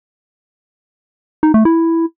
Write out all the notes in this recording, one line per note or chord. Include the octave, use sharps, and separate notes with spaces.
D#4
A3
E4